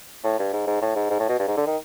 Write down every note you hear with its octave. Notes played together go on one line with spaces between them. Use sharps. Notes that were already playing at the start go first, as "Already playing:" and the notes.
A2
G2
G#2
G#2
A2
G#2
G#2
A2
B2
G2
G#2
D3
D#3